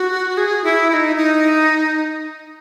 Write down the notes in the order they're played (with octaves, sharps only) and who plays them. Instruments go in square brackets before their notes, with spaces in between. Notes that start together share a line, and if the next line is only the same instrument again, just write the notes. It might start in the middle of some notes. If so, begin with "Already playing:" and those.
Already playing: [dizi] F#4
G#4
E4
E4
D#4
D#4